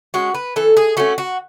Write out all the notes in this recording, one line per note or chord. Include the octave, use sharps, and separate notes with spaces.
G#3 C#4 F#4
B4
E3 A4
G#4
A3 C#4 F#4
F#4